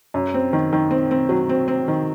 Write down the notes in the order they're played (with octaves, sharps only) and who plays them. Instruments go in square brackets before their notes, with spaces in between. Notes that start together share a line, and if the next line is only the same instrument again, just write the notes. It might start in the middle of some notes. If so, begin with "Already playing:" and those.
[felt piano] F#2
C4
D#3
D#3
C4
C4
F#3
C4
C4
D#3